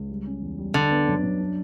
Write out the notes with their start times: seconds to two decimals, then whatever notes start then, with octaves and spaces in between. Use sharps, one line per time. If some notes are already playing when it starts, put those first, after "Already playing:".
Already playing: C#2
0.10 G3
0.26 C#4
0.42 E2
0.58 G3
0.74 D3 D4
0.91 B3
1.08 F#2
1.23 F#2
1.40 D4